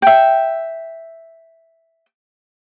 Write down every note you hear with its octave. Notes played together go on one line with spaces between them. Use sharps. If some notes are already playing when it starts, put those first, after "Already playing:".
E5 G5